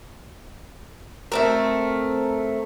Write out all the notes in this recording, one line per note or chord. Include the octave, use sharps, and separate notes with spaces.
A3 C4 A#4